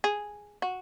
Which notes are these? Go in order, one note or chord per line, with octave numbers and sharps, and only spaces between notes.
G#4
F#4